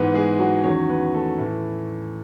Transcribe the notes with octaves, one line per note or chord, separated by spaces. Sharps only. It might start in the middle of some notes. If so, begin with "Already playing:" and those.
Already playing: G#2 E3 B3 B4
G#3 G#4
F#3 F#4
E2 D#3 F#3 C#4 C#5
B3 B4
A3 A4
A2 E3